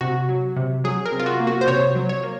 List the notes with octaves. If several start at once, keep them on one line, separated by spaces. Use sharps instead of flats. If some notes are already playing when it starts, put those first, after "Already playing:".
C3 F#4
F#3
C3
F#3 G#4
A#4
C3
F4
F#4
A#3
F#4
C5
C3 C#5
F#3
C#5
A#3